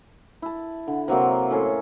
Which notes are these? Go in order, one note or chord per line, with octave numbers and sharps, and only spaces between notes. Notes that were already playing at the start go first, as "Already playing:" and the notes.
E4 A5
D3
C3 F#3 A#3 C4
A2 C#4 G#4 A4